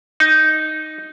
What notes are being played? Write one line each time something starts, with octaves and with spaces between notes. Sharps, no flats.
D#4